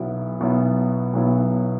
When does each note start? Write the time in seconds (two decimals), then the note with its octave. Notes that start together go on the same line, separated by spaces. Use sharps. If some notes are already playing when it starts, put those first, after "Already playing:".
Already playing: B1 B2 F#3 B3 E4
0.40 B1 B2 F#3 B3 E4
1.13 B1 B2 F#3 B3 E4